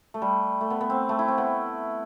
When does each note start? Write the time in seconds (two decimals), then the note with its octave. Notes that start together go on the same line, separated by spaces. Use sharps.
0.14 A3
0.22 G3
0.61 A3
0.70 B3
0.81 B3
0.90 C4
1.09 A3
1.19 E4
1.28 C4
1.38 B3